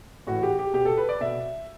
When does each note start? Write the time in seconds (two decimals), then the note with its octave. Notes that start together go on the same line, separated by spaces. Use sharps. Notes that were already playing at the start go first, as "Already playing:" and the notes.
0.27 A2 E3 F#4
0.43 G4
0.59 G4
0.74 B2 G4
0.85 A4
0.97 B4
1.09 D5
1.21 B2 E5